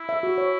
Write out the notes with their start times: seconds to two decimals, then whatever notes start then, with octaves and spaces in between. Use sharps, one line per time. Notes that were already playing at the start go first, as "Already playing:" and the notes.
Already playing: E4
0.09 E5
0.23 F#4
0.38 C#5